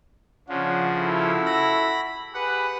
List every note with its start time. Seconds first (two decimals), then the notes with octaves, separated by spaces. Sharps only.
0.49 C#3 F3 D4 C#5 F#5
0.99 E4 F#4 A4
1.46 B5 A#6
2.34 G4 G#4 B4 F#5